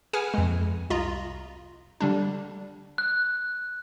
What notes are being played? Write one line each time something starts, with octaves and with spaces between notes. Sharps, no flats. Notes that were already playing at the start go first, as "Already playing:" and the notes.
G#4 B4 F#5 G#5 F6
F2 G#3
C2 F4 D#5 A#5
D3 G3 D4
F#6